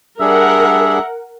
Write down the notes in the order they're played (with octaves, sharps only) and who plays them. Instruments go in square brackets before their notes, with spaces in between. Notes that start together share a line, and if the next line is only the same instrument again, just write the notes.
[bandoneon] G3 D4 G#4 [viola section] A#4 F#5 [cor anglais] E5